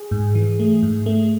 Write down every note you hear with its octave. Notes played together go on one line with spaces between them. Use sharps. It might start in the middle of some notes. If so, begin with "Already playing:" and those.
Already playing: G#4
G#2
E3
A3
G#2
A3